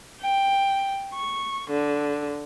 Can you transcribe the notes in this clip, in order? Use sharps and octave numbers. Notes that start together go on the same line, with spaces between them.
G5
C#6
D3